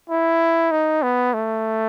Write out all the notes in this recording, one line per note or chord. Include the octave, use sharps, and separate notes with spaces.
E4
D#4
B3
A3